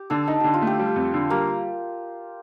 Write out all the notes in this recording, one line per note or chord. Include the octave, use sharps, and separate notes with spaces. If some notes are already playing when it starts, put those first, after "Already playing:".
Already playing: G4
D3 A4
D#4 A4
D3 G4
F4
A3
G4
G3
F2
D3
G3 A#3